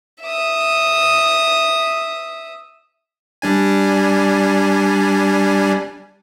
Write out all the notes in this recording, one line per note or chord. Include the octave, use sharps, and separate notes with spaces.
E5 D#6
G3 D4 G#5